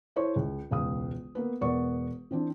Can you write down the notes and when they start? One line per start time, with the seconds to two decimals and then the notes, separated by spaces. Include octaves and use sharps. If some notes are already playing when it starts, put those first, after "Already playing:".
0.16 E4 A4 C5 C#5 C#6
0.36 C#2
0.71 E1 C#2 F5 D#6
1.35 A#3 B3 B4
1.61 E1 B3 A#4 D5 F#5 C#6
2.31 E3 C4 D4